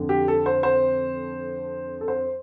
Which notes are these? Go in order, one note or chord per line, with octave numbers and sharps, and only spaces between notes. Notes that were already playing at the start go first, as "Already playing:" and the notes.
Already playing: F2 D3
G4
A4
C5
C5
A4
C5